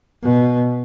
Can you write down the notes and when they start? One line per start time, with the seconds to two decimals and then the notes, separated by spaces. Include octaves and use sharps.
0.23 B2